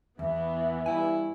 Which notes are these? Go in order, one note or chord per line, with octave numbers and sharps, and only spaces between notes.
E2 E3 B3 E5
G2 E4 G#5